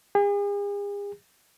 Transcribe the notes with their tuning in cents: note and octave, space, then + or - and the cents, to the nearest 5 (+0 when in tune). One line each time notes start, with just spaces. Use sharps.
G#4 -45